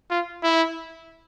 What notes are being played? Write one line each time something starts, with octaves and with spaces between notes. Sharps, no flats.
F4
E4